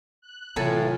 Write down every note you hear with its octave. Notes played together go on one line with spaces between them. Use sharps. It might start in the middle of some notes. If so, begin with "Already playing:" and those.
F#6
A2 C3 E3 F#3 F4 A4 G#5 A#5